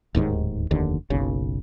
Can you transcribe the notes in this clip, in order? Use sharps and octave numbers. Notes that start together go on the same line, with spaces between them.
D1 D#2 G#2 D#3
F1 D#2 D3
F#1 B1 C#3